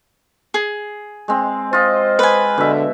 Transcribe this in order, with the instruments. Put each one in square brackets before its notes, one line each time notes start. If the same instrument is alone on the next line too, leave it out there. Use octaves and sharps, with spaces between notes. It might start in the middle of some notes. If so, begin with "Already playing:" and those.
[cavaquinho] G#4
[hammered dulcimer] G#3 C4
[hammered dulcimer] F4 D#5 [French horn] C5
[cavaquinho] B4 G#5
[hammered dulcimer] B2 E5 [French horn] D3